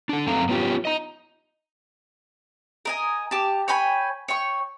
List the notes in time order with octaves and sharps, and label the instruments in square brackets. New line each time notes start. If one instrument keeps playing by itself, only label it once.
[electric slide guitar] D4 A4
F#2 A3 C4 A4 F5 A#5
B3 C#4 F4 G4
D#5 A#5
[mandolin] A#4 D#5 G#5
G4 A5
C#5 G5 G#5 B5
C#5 G5 C#6